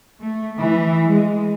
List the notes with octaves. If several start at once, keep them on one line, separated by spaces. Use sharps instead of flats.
A3
E3
G#3